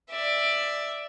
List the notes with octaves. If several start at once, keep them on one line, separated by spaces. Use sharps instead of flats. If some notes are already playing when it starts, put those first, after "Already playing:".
D5 E5